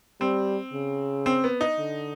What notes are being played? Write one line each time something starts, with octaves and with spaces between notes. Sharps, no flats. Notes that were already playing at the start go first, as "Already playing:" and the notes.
G3 C4
C#3
C4
B3
D#4
D3